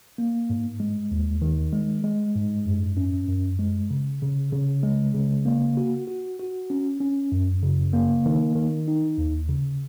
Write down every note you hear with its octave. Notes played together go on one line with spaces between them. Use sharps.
A#3
G#2
G#3
D#2
D#3
G#3
G#3
G#2
F#2
C#4
F#2
G#3
C#3
C#3
C#3
G#3
C#3
A#3
F#4
F#4
F#4
C#4
C#4
F#2
C#3
A#3
D#3
D#3
D#4
D#2
C#3